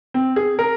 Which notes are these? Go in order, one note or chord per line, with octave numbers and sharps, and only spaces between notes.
C4
G#4
A#4